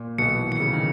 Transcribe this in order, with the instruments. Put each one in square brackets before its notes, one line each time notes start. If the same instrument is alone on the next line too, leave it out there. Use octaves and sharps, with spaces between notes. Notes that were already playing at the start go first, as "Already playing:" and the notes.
Already playing: [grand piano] A#2
[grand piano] B1 B2 [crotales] C#7
[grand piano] E3
[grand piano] D#3 [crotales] C#7
[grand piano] C#3
D#3